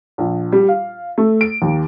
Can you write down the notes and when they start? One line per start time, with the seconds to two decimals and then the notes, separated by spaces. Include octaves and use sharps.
0.18 A#1
0.53 G3
0.69 F5
1.18 A3
1.41 D7
1.62 D#2